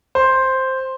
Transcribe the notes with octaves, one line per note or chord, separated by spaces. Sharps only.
C5